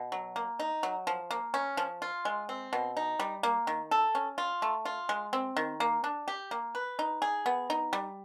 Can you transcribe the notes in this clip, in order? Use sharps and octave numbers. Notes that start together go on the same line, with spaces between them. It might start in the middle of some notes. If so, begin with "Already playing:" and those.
Already playing: B2
F#3
A#3
D#4
F#3
F3
A#3
C#4
F3
F4
G#3
C4
B2
D#4
G3
A#3
D#3
A4
C#4
F4
A3
F4
G#3
C4
D#3
A#3
D4
G4
A#3
B4
D#4
G#4
B3
D#4
G3